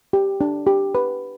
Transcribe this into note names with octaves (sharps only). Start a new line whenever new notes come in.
G4
D4
G4
B4